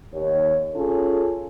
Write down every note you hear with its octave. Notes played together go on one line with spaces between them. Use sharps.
D#2 C#5
C#4 F4 G#4 A4